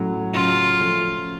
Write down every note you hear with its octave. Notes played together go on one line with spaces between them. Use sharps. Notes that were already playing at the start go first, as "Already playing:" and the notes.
Already playing: A2 F#3 C#4
C#3 F#3 C#4 F4
F3 A3 C#4